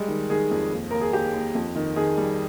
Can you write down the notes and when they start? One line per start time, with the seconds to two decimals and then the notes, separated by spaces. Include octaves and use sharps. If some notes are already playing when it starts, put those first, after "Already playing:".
Already playing: G3 G#3
0.08 D#3
0.30 D#3 G#4
0.51 F2
0.72 D#2
0.91 D#2 A#4
1.01 G#4
1.13 D#2 G4
1.33 D#2
1.55 F2
1.76 D#3
1.96 D#3 G#4
2.17 G3